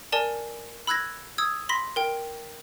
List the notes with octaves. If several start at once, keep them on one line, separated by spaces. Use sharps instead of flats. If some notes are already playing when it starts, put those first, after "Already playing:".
A#4 D5 G#5 A5
B5 E6 F#6 G#6 A#6
D#6 E6 G#6
B5 C6 A#6 B6
A#4 G5